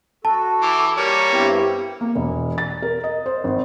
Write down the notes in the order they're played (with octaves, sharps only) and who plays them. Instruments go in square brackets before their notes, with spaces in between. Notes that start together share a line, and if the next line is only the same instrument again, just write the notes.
[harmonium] F#4 A4 [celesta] A5
[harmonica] E3 D6
[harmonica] G3 A#3 C#5 [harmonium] G4
[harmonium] G2 C4 [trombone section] B3 E4 G4
[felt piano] A#3
E1
A6
A#4
D#5
C5
G#1